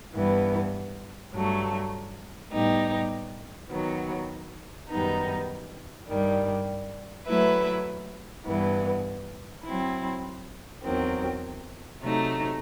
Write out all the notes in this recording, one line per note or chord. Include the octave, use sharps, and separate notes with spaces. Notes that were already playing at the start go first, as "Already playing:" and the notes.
G2 E3 B3
G2 F#3 A3
A2 G3 B3 D#4 G4
D#3 F#3 B3
F#2 D#3 G3 B3 D#4
G2 D#3 G3
F#3 A3 E4 B4 E5
G2 E3 B3
F#3 C4 E4
E2 D#3 F#3 C4
C3 F#3 A3 D#4